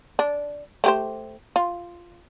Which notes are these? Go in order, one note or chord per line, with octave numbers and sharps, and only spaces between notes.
D4
A3 G4 C5
F4